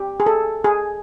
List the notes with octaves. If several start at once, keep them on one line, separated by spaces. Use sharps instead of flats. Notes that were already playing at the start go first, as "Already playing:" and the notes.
Already playing: G4
G#4
A4
G#4